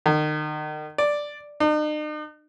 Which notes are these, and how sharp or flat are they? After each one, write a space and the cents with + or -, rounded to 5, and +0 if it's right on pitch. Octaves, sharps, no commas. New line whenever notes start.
D#3 -35
D5 +0
D#4 -45